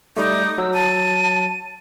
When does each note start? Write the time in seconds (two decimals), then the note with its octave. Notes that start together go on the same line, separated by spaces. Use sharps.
0.17 G3 A3 D#4 D6
0.58 F#3 E6
0.74 A5 D#7